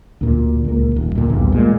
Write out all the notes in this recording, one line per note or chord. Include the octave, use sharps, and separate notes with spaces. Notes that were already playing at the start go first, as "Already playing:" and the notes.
D2 A#2
C#2 A#3
D#1
C#2 A#2
B1 E2 G2
A#2 E3 G#3